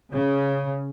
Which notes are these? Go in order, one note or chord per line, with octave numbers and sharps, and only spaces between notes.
C#3